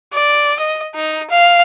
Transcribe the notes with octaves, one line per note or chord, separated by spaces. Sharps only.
D5
D#5
D#4
F5